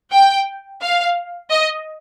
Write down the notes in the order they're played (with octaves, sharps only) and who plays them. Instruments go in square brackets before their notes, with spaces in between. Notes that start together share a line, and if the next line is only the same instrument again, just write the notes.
[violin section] G5
F5
D#5